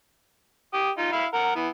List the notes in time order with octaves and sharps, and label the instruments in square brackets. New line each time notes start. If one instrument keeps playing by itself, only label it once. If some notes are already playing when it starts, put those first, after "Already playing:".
[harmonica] G4 D#6
D#4 F4
E4 F5 B5
A#4 F#5
E3 B3